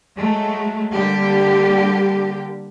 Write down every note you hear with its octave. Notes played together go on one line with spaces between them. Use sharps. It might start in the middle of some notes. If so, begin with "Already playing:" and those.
F#3 G#3 A3
D3 G3 A#3 G4